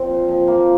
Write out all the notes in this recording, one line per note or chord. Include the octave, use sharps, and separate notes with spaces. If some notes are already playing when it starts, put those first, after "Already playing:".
Already playing: F3 C4
A#2
F3
F3 A#3